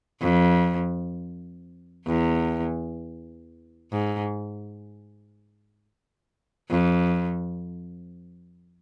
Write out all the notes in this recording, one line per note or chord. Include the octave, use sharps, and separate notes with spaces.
F2
E2
G#2
F2